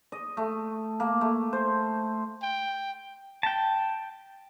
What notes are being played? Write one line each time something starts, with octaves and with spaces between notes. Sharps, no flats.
D#5
A3
A#3
A3
C5
G5
G5 A5